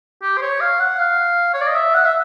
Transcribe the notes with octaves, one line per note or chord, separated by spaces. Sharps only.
G4
C5
C#5
F5
F#5
F5
C#5
D5
D#5
E5
F#5
E5